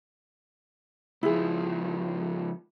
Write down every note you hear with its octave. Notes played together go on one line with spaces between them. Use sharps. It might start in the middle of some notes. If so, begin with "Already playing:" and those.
C#2 F3 E4 G#4